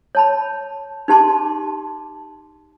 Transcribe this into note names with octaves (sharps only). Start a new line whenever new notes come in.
C#5 A5 B5
D#4 G4 A5 C6 D6